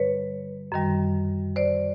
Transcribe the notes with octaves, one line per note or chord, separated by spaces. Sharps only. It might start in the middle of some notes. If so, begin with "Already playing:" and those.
Already playing: G2 D3 G3 B4 C#5
F#2 D#3 G3
C5 D5